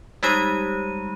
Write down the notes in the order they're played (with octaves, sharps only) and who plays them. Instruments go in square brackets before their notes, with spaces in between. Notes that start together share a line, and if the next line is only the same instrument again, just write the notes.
[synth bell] G3 G#3 D#4 G4 D#7